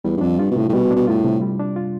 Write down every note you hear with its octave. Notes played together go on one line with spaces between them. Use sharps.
E2 G3
G2
F2 D4
G2 F4
B2
A2 C3
A2
B2 G3
D4
B2
A2 F4
C3
G3
D4
F4